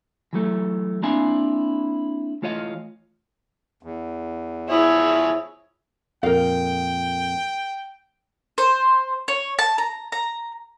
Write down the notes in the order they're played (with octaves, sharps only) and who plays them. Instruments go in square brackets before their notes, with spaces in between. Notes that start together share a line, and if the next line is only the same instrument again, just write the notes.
[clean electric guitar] E3 F#3 A3
A#3 C4 D4 E4 F5 G#5
E3 A3 F4 C#5 D#5 F5
[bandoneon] E2
[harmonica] F3 G#4 C#5 [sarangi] E4
[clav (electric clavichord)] F2 A#2 [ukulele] A#4 F5 [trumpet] G5
[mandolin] C5
C#5
A5
A#5
A#5